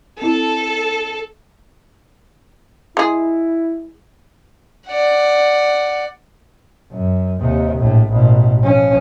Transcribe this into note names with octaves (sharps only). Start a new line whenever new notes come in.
C4 E4 A4
G#3 E4 G#4
D5 F#5
F#2
D#2 C3
A#1 A2
A1 B2
F3 C#4